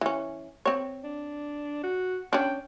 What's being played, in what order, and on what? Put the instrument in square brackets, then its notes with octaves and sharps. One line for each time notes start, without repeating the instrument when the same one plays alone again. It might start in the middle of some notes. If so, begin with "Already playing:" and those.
[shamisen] E3 C#4
C4 C#5
[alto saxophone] D4
F#4
[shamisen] C#4 D4 [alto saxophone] G5